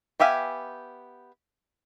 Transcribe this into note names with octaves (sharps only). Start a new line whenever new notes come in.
B3 G4 E5 F5 G#5